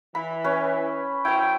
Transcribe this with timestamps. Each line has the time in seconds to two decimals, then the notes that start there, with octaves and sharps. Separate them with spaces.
0.15 E3 B5
0.44 C#4 B4
1.25 F#2 C#4 E4 C5 G5